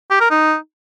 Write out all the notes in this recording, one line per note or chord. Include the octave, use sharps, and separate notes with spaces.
G4
A#4
D#4